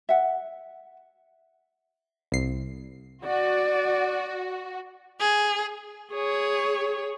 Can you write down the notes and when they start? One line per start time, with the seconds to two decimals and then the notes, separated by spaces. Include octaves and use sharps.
0.09 E5 F#5
2.32 C2 C7
3.25 F#4 D5
5.20 G#4
6.13 G#4 C#5